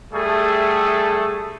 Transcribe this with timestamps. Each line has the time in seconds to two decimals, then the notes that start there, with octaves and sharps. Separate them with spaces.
0.13 G3 A3 G#4 A4 E5 C#6